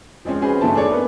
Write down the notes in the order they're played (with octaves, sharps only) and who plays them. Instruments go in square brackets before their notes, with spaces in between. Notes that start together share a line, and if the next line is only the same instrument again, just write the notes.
[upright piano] F3 G#3 C4 C#4
C#4 D#4 F#4 G#4 B4 C5
G2 E3 A3 C4 A5
D4 G#4 A4 C#5 D5
B3 A#4 B4